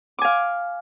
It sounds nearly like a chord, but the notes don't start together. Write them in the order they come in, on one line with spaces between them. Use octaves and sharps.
D6 G#5 F5